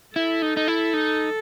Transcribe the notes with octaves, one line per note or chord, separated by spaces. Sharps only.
E4 A4
D#4
D#4
E4
D#4